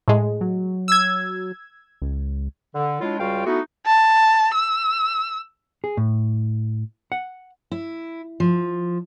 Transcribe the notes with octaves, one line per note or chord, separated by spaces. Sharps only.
A2 G#3
F#3
E6 G#6
C#2
D3
F#3 G#3 D4 E4 F4
C#2 G3 F4 F#4 F5 G5
A3 B3 D#4 E4 F#4
A5
E6
G#4
A2
F#5
E4
F3